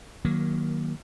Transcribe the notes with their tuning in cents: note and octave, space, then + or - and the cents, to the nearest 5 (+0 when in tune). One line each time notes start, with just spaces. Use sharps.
D#3 +0 F#3 +0 A#3 +15